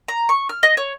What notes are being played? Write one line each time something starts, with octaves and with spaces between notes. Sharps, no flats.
A#5
C#6
F6
D#5
C#5